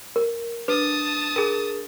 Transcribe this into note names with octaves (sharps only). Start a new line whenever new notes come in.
A#4
D4 B4 A5 D#6
G#4 A#4